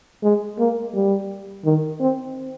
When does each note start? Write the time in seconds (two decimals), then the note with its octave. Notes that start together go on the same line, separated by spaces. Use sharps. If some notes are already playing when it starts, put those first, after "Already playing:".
0.23 G#3
0.58 A#3
0.94 G3
1.65 D#3
2.00 C4